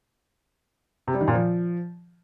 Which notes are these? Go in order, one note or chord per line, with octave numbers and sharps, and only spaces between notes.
C3
G3
D#3
A#2
F3